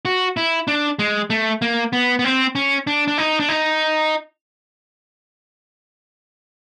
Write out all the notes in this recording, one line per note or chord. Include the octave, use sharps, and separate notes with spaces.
F#4
E4
D4
G#3
A3
A#3
B3
B3
C4
C#4
D4
D4
D#4
D4
D#4